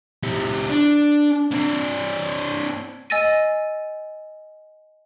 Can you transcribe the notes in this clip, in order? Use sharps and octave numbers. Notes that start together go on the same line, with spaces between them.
C#2 G4
D4
C4 D4
D#5 G#5 E6 A6 A#6 D#7